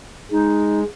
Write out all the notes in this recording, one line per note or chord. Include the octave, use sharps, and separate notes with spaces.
G#3 D#4